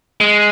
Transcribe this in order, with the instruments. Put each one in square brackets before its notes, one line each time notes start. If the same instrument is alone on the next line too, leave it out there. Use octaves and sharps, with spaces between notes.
[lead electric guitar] G#3